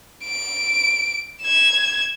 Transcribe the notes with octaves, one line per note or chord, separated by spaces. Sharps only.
D7
G#6 E7